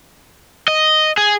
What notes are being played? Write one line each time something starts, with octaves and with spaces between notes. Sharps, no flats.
D#5
G#4